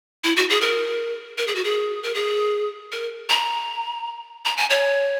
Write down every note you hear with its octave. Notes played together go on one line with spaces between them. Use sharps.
E4
F#4
G#4
A#4
A#4
G#4
F#4
G#4
A#4
G#4
A#4
A#5
A#5
G#5
C#5